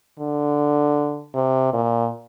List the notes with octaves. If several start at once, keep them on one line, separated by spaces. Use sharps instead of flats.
D3
C3
A#2